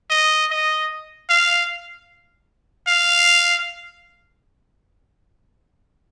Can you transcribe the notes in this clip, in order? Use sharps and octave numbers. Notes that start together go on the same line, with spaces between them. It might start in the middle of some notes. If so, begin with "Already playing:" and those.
D#5
D#5
F5
F5